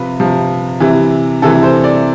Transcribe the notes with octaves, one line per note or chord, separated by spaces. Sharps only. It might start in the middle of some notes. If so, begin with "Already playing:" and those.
Already playing: C3 F3 B4
C3 F3
C3 E3
C3 E3 A4
C5
D5